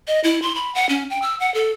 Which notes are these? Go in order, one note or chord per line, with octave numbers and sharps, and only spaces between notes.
D#5
E4
C6
B5
F#5
C#4
G5
E6
F#5
A4